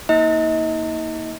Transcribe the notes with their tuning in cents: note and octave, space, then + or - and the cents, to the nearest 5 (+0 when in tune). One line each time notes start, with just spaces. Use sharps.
A#3 +0 D#4 +40 D#5 +35